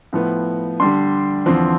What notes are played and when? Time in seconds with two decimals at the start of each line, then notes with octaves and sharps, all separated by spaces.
0.13 A2 F3 B3
0.80 D3 G3 D4 C6
1.46 E2 D3 F3 C4